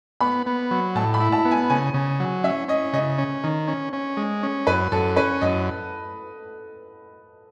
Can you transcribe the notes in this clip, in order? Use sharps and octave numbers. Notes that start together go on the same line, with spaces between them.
B3 B5
B3
F#3
A2 A5
B5
E4
A5
B3
G#5
C#3 G#5
C#3
F#3
C#4 E5
C#4 D#5
C#3 D#5
C#4
D#3
C#4
C#4
G#3
C#4
F#2 B4
F#2 A4
C#4 B4
F#2 D#5